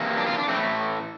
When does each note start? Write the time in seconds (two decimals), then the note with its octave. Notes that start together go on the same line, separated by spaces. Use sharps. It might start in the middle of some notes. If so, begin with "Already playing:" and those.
Already playing: C3 E3 A#3
0.17 D4
0.27 F4
0.38 D4
0.48 A2 E3 A3 C4